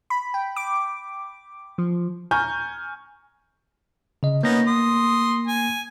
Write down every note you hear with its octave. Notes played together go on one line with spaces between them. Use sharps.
B5
G5
D6
F3
G#5 A#5 C#6 F6 G6
C#3 D#5
A#3 B3 C#4 D#4 A#6
C6 D#6
G#5